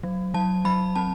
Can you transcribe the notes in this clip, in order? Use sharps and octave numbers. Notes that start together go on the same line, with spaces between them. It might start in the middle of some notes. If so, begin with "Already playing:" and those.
F#3
F#3 A5
F#3 B5
C4 A5